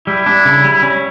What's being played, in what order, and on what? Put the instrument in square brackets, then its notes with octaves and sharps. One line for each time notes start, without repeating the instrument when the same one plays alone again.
[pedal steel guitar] G3 [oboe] E4
[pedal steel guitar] D4
C#3
G3
C#4